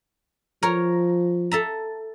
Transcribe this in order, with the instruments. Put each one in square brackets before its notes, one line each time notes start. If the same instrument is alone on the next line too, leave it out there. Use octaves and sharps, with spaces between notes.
[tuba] F3 [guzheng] A#4 C#5 A#5
[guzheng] A4 E5 A#5